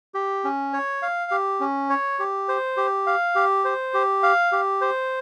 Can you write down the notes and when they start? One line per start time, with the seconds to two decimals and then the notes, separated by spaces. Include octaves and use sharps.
0.14 G4
0.44 C#4
0.73 C#5
1.02 F5
1.31 G4
1.60 C#4
1.90 C#5
2.19 G4
2.49 C5
2.77 G4
3.07 F5
3.36 G4
3.65 C5
3.94 G4
4.23 F5
4.52 G4
4.81 C5